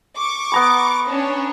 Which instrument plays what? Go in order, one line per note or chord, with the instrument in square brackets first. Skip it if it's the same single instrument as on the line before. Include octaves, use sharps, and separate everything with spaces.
[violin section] C#6 D6
[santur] B3 A#5 B5
[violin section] C#4 D4 C#5